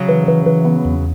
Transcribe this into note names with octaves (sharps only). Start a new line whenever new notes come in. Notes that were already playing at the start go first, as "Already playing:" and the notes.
Already playing: C#3 F#3
E3
E3
E3
B3
E2